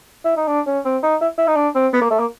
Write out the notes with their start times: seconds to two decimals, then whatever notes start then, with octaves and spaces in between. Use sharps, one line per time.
0.25 E4
0.37 D#4
0.48 D4
0.66 C#4
0.85 C4
1.03 D#4
1.21 E4
1.38 E4
1.48 D#4
1.56 D4
1.75 C4
1.93 B3
2.01 A#3
2.11 A3
2.19 A#3